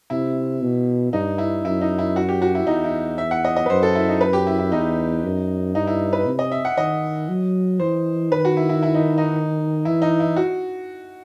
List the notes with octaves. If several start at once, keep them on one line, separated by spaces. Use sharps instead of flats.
C3 E4
B2
G2 D#4
E4
F#2 E4
D#4
E4
F#4
G4
F#4
E4
E2 D#4
E4
E5
F#5
D#5
D#5
B4
F#2 C5
A4
E4
D#4
B4
G4
E4
E4
E2 D#4
F#2
G2 D#4
E4
B4
C3
D#5
E5
F#5
D#3 D#5
F#3
E3 C5
D#3 B4
F#4
E4
E4
E4
D#4
D#4
E3 E4
D#4
E4
F#4